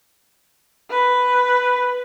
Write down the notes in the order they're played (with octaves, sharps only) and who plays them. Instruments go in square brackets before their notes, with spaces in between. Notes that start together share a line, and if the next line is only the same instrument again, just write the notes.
[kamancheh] B4